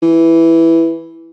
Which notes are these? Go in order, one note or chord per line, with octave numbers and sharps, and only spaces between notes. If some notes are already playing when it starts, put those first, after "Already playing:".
E3